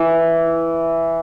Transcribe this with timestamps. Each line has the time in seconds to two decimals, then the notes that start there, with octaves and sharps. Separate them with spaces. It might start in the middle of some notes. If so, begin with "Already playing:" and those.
Already playing: E3